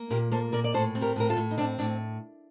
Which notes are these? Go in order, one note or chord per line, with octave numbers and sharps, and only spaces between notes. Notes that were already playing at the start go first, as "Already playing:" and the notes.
Already playing: A#3
A#2 G4 A#4
A#3 A4 C5
A#2 A#4 D5
D5
A2 A4 C5
C4
G4 A#4
A2 A#4
F4 A4
A2
D#4
C4 D4
A2 D4